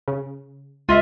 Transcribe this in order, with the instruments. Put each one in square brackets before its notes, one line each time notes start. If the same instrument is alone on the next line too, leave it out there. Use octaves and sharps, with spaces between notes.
[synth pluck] C#3
[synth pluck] C#2 [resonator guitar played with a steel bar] F4 D#5 E5